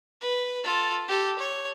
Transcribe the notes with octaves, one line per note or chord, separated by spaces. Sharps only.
B4
F4 A4
G4 A4
C#5